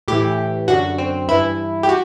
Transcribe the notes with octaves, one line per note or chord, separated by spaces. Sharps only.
A2 E3 G4
F#2 D3 F#4
C4
G2 E3 E4
G4
F#4